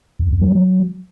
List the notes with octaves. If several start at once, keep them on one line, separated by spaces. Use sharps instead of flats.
F2
F2
F#3
F#3